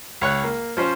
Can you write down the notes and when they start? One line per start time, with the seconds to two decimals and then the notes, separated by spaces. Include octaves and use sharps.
0.21 C#2 C#5 C#6 F#6
0.44 A#3
0.77 F3 C#4 C5